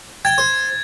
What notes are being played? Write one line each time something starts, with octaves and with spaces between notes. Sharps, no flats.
G5 G#6 A6
C5